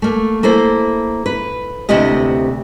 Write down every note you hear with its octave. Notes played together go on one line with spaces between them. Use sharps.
A3 A#3
A#3 E4 A4 C5
B4
D2 C3 B3 E4 G4 D#5